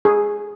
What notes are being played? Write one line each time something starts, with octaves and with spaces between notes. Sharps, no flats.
G#4